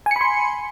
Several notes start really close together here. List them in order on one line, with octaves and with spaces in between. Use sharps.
G#5 C#7 B5 C6